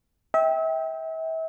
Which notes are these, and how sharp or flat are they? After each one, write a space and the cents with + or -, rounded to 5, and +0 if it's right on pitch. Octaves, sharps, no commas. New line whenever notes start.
E5 -35 G5 +5